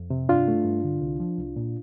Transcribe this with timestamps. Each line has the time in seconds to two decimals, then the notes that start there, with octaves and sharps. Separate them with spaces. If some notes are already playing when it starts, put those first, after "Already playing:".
Already playing: F2
0.10 C3
0.29 G2 D4 F4
0.48 A3
0.65 G2
0.84 D3
1.01 C2
1.20 F3
1.38 C2
1.56 A#2